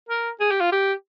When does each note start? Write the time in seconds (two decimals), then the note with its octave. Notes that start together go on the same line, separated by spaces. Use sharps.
0.09 A#4
0.40 G#4
0.51 G4
0.61 F4
0.72 G4